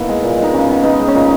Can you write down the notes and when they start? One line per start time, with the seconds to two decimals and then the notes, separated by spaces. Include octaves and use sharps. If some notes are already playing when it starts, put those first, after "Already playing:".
Already playing: D#3 A#3 B3 E4
0.09 G#3
0.24 A#2
0.39 G#3 D#4
0.53 C#3 C#4
0.68 B3
0.83 B3 D#4
0.99 G#3
1.08 C#4
1.15 A#2 D#4